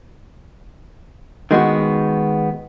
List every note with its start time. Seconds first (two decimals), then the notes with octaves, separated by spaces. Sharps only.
1.51 D#3 G#3 B3 F#4